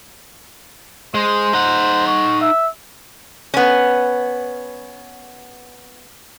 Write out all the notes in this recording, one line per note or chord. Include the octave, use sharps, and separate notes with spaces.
G#3 C5
D#4 F#5
C#6
E5
B3 C#4